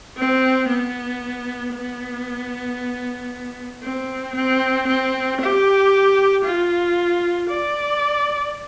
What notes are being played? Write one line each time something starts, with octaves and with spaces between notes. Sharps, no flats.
C4
B3
B3
C4
C4
C4
G4
F4
D5